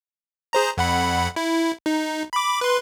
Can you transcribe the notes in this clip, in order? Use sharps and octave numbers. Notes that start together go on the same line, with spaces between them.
G#4 C5 A#5
F2 F#5 B5
E4
D#4
B5 D6
B4 C6